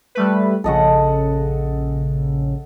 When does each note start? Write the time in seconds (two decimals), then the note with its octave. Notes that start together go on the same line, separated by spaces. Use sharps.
0.15 G3 A3 B4
0.64 A#1 C#3 A4 D#5 F#5